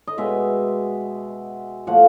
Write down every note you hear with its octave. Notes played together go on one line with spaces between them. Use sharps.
D#5
B2 G#3 E5
A#2 F3 A3 F#5